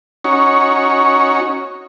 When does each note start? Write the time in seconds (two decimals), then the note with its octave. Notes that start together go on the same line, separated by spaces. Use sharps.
0.24 C#4 D#4 F#4 C#5